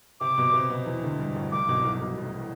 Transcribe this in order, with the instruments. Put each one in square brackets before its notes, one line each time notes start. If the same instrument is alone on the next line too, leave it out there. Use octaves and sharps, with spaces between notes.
[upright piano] C3 C4 [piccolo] D6
[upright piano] B2 B3
C3 C4
B2 B3
E2 E3
D2 D3
G2
A1 A2
[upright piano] C2 C3 [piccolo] D6
[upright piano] C3
B1 B2
B1 B2
B1 B2
A1 A2